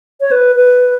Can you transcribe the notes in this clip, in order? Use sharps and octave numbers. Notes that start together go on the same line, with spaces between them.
C#5
B4
B4